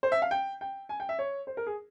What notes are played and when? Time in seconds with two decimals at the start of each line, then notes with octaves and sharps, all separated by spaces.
0.03 C5
0.12 E5
0.22 F5
0.31 G5
0.61 G5
0.89 G#5
1.00 G5
1.09 E5
1.19 C#5
1.47 C5
1.57 A#4
1.67 G#4